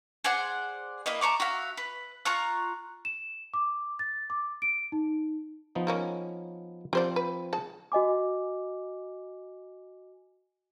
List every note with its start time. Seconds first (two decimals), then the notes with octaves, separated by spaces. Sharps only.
0.24 G#4 C5 D5 F#5
1.06 A#3 E4 D#5
1.21 A5 A#5 C#6 D6
1.40 F#4 E5 F5
1.77 B4
2.25 F4 A#5 C#6 F#6
3.05 E7
3.54 D6
3.99 A6
4.30 D6
4.62 D7
4.92 D#4
5.75 F3 B3 D#4
5.87 G#3 A#3 C#4
6.93 F3 C4 G4 C5 D5
7.16 B4
7.53 G#4 A5
7.92 F#4 D#5 G#5 D6